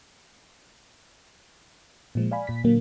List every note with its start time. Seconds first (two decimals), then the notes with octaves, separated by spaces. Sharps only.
2.15 A#2 F3 G#3
2.31 D5 F5 G#5 B5
2.47 A#2 B6
2.64 A#2 D3 F#3 A#3